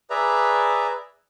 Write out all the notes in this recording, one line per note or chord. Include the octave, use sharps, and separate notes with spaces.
G#4 B4 D5 E5 A#5